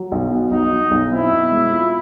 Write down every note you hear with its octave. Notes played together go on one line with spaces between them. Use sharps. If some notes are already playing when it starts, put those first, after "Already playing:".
Already playing: F#3
B1
B2
B1 D#4
F#3
B1
C4 E4
B2
G#3
F4